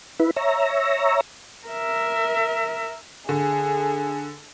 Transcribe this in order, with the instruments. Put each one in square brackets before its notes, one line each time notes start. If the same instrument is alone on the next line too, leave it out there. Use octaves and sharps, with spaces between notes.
[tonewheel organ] E4 B4
C#5 E5 A#5
[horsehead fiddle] A#4 E5
[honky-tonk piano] D3 [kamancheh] G#4